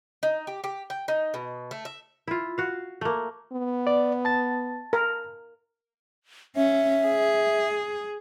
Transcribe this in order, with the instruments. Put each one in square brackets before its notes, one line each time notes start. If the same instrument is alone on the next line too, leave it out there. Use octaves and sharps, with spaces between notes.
[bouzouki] D#4
G4
G4
G5
D#4
B2
A3
E5
[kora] E4 F4
F#4 F5
A3 A#3
[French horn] B3
[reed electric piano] D5
A5 A6
[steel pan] A#4
[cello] C#4 [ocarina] E5
[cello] G#4